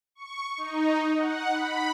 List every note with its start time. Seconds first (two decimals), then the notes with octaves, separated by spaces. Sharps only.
0.15 C#6
0.58 D#4
1.18 F#5
1.53 B5